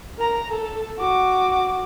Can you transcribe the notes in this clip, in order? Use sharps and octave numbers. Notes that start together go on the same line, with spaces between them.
A#4 A#5
A4
F#4 D6